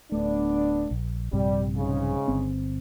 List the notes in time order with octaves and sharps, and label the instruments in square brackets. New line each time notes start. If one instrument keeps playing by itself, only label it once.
[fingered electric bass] D1 A3 [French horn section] B3 D4
[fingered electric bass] A#1
[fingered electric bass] A#1 G2 C3 [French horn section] G3
[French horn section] G#2 C#3
[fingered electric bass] G1 C4